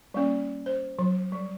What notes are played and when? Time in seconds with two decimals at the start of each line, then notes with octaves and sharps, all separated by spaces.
0.14 G3 A#3 C#4
0.66 C5
0.99 F#3
1.32 G3